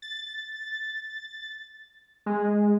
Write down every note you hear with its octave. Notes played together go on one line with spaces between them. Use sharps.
A6
G#3